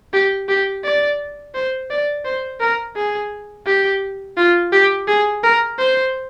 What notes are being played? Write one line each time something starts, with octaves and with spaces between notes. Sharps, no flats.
G4
G4
D5
C5
D5
C5
A#4
G#4
G4
F4
G4
G#4
A#4
C5